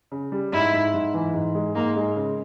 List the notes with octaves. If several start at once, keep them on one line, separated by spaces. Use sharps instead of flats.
C#3
G3
G#2 E4
G#2
G#2
E3
G#2
G#3
G#2 A#3
G#3
C#3